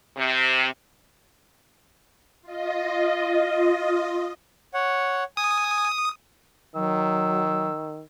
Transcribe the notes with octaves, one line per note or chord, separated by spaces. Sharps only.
C3
F4 D#5
C#5 F#5
G#5 D#6
D#3 F#3 E6